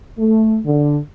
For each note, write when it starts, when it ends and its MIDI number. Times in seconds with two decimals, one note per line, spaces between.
0.18 0.59 57
0.65 0.98 50